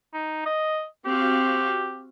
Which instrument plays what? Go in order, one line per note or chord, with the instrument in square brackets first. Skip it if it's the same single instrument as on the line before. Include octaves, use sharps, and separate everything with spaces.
[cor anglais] D#4
D#5
[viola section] C4 F#4 F5 [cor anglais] G4